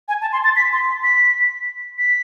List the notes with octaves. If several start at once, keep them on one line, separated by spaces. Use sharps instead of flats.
G#5
A5
C6
A6
B6
C6
B6
B6